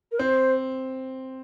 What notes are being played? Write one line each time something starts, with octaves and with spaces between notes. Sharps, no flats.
A#4
C4 C5